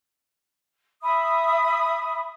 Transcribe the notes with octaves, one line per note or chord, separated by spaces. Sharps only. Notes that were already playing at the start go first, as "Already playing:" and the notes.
E5 B5 D#6